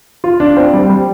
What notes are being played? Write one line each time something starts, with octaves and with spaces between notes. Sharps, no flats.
F4
D4
C4
G3
G3